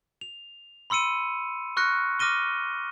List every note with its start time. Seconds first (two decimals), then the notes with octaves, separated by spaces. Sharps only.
0.21 F7
0.90 B5 C6 E6 C#7 D#7
1.77 C#6 F6 F#6 A#6 C#7
2.19 D6 F6 A#6 D#7 G7